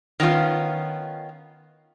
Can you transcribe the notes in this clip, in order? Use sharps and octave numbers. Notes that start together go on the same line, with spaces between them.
D#3 B3 C#4 F4